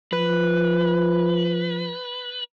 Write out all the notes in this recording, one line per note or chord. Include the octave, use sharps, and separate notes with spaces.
F3 B4